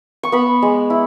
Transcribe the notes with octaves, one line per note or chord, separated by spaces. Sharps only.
C#6
B3 B5
G#3
E4